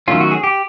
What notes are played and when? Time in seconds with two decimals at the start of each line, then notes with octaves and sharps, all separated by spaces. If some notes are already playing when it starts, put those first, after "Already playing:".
0.08 D#3 F#3 A3 C#4 F4
0.20 F#4
0.31 G#4
0.44 G4